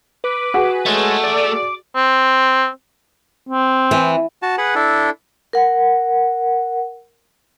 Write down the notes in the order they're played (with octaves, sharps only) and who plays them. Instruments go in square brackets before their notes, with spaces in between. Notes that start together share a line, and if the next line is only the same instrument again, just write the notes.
[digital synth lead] B4 [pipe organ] D6
[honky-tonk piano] F#4 G#4
[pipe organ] G#3 C#5 [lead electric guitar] A3
[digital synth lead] D5 [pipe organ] D6
[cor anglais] C4
C4
[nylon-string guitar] E3
[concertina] F#4 A5
G#4 B4 F#5
D4 E4 A4
[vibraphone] A#4 F#5